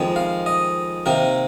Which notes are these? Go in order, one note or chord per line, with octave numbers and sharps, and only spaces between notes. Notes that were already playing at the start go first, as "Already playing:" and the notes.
Already playing: F2 D#3 G#3
F5
D#5
C3 D#3 A#3 A#4